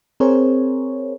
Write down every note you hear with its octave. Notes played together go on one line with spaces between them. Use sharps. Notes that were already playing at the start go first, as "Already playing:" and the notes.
C4 G#4 A#4 C5 C#5